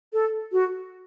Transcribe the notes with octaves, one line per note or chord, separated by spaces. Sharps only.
A4
F#4